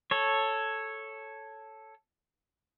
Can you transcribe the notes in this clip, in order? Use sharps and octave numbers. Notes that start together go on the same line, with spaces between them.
A4 C#5